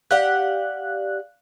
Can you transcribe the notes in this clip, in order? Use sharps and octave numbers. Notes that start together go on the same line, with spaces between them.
G4 D5 F5 F#5 F#6